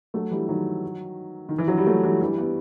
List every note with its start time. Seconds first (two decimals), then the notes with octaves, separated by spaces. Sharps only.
0.14 F#3 A3
0.31 E3 G3
0.48 D#3 F#3
1.49 D#3
1.58 E3
1.68 F#3
1.77 G3
1.87 F#3 A3
2.04 E3 G3
2.21 E3 G3
2.38 G3 B3